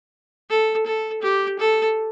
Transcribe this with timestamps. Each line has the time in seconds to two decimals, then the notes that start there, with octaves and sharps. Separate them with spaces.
0.50 A4
0.86 A4
1.22 G4
1.59 A4